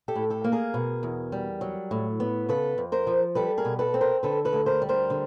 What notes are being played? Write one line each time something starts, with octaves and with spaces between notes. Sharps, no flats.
G4 A4
A2
G4 A4
A#3
G#4 A#4
B2
E2
G3
F#3
A2
B3
C#3 A4 B4
F2
A#4 C5
F3
G3 A4 B4
G#4 A#4
B2
A4 B4
C4
A#4 C5
D3 A4 B4
A4 B4
D2
A#4 C5
G3
A#4 C5
D3